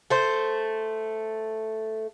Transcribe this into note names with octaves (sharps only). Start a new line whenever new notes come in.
A3 C5